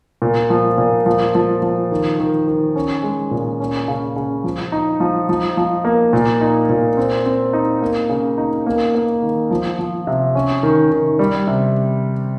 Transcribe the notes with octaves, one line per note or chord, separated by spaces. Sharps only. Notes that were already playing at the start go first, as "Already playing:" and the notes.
A#2
F3
A#2
F3
F3
F3
D#3
D#3
D#3
C#4
G#3
A#2
C#4
C#3
C#3
F3
D#4
F3
F3
F3
A#3
A#2
D#4
A#2
C4
C4
D#4
A#3
C#3
D#4
A#3
A#3
D#3
F3
F3
C3
C#4
D#3
D#3
G3
C3